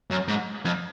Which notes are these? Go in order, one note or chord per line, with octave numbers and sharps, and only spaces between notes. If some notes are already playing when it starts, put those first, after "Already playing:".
F#2
G#2
F2